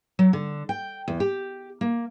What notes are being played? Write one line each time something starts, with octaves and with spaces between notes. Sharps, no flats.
F#3
D3
G5
E2
G4
A#3